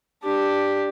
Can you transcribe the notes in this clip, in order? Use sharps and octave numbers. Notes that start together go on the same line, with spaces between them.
D4 G4